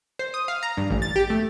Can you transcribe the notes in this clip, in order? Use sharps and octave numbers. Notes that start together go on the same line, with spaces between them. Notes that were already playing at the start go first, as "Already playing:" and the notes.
C5
D#6
F5
A#5
G2
A1
A6
G4
A3